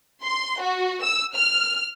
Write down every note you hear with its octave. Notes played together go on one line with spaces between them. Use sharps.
C6
F#4
E6
F6